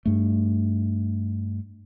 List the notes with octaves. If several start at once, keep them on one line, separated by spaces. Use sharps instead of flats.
G2 A3